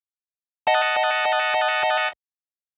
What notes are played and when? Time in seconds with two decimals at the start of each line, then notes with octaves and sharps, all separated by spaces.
0.67 D#5 F#5 A5